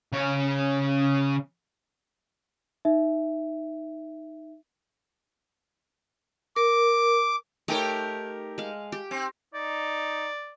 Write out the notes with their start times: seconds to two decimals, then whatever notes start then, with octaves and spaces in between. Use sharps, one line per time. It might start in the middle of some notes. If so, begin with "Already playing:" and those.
0.13 C#3 C#5
2.85 D#4 E5
6.56 A#4 D6
7.68 A3 D#4 G4 A#4 C#5
8.58 G#3 F5
8.92 G4
9.11 C4
9.54 D#4 D5